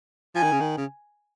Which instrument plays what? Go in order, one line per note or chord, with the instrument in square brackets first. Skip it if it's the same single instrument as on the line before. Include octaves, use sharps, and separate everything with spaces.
[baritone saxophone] F3 [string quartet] G#5
[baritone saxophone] D#3
C#3
D#3
C#3